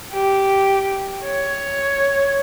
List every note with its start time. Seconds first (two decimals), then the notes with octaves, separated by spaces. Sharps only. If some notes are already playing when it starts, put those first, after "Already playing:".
0.12 G4
1.25 C#5